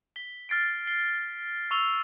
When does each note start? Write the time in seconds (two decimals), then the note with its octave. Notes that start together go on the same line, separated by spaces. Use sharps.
0.16 B6 G7
0.49 F6 A6 C7 D7
0.87 C7 G7
1.71 C#6 E6 F7 G7